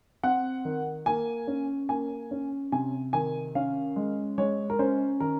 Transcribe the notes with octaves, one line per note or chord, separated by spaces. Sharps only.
C4 F#5
D#3
A#3 G#5
C#4
A#3 G#5
C#4
C3 G#5
D#3 G#5
C#4 F5
G#3
G#3 C#5
A#4
C#4 C5
D#3 A#4